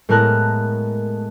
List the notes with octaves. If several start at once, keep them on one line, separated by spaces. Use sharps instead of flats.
A2 G#3 B3 A#4 A5 F#6